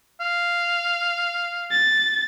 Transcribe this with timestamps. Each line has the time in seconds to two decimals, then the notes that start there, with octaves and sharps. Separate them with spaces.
0.20 F5
1.72 A6